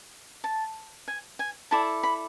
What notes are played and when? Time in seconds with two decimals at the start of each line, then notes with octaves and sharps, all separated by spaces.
0.44 A5
1.08 G#5
1.39 G#5
1.71 E4 A4 D5 A5
2.03 B5